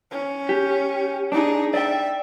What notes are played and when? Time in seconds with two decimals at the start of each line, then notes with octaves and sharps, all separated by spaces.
0.11 C#4
0.49 G4
1.32 D4 D#4 G#4
1.74 D5 E5 G5